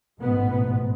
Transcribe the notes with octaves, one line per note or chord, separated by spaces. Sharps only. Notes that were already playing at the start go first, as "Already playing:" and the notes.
A1 G#2 B2 B3